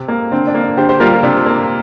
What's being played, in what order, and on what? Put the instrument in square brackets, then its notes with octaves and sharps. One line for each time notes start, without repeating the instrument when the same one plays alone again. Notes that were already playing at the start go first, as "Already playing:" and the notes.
Already playing: [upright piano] C3
A#3
D3 C4
D4
A#3
D4
D3 G4 C5
G4 C5
G3 A#3 F4 A#4
C3 D4
A#3